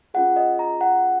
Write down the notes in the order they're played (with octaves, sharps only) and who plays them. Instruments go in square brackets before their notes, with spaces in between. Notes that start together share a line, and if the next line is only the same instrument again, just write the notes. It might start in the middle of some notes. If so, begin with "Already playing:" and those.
[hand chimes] C#4 F4 G#4 F#5
D#5
A#5
F#5